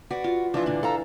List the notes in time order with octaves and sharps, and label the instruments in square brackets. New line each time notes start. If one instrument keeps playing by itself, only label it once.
[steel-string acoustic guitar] F#4 [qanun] B4 D5
[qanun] F4
[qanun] E3 D4 [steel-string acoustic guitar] F3 E4 F4
[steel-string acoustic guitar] G2 A#2 D3
A4 F5 A#5